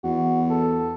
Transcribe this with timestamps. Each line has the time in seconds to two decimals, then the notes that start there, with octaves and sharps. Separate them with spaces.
0.04 E2 F#4
0.51 A4